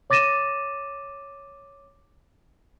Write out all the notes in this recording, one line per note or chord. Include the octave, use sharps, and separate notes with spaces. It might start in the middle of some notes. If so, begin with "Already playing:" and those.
C#5 D6 A6 A#6 D#7 E7